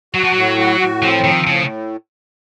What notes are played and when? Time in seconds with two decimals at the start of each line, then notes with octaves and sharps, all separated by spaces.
0.14 F#3 F#4
0.24 F3
0.33 A2 F#3
0.58 F#4
0.80 A2
1.02 F3 C4
1.24 D#3 F3
1.46 A2 C#3